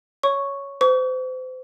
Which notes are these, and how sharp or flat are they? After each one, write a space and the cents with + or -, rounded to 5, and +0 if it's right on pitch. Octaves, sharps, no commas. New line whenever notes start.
C#5 +5 C#6 +0
C5 -35 C#6 +40